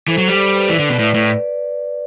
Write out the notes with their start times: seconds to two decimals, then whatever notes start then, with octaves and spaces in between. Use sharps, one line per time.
0.08 E3 A4 C5
0.18 F#3
0.28 G3
0.38 D5
0.47 C5
0.55 B4 D5
0.69 E3
0.79 D3
0.89 B2
0.99 A2 B4 D5
1.14 A2